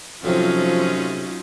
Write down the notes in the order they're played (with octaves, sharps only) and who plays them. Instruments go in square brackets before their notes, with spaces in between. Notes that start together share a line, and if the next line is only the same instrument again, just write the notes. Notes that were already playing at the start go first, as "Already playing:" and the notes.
[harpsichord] A2 C3 [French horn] F3 [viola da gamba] F#3 C#4 D#4 [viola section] F4